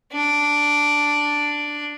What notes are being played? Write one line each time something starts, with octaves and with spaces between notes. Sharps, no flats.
D4